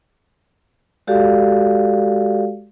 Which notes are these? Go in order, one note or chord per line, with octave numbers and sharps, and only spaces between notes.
G#3 F#4 G4 A4 D5 F5